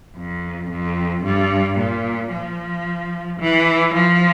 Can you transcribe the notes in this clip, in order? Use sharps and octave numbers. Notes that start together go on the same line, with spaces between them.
F2
F2
G2
A#2
F3
E3
F3